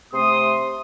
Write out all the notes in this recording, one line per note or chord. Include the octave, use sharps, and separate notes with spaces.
C3 A3 C6 D#6